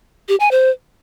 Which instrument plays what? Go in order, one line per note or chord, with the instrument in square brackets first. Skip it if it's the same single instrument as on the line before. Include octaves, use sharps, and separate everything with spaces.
[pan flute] G4
G#5
C5